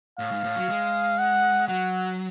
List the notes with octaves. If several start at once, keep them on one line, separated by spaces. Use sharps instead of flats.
A2 F5
G#2
A2
F#3
G#3
F#5
F#3 F#5